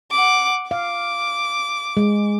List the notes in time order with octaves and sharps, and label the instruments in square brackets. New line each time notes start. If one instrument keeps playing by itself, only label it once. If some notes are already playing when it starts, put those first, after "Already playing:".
[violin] F#5 D6
[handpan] F5 [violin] D6
[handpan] G#3